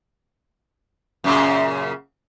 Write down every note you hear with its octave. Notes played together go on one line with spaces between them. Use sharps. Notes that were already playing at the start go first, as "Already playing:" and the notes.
F#2 A#2 C#3